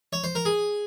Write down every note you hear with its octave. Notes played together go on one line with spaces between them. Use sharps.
C#5
C5
A#4
G#4